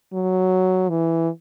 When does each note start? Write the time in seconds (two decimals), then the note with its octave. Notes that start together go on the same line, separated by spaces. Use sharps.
0.13 F#3
0.89 E3